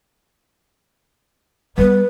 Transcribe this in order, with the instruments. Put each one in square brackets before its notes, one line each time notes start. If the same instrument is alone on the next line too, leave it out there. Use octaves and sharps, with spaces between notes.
[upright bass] G3 B3 [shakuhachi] B4